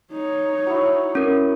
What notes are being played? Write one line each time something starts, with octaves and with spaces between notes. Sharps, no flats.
D#4 C#5
F#3 E4
C#4 A#4